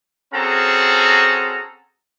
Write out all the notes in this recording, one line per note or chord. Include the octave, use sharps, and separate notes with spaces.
C4 C#4 F#4 G#4 A4 A#5